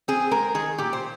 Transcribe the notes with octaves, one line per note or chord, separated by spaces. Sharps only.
C4 G#4
G#3 A#4
D#3 G#4
A#2 G4
C5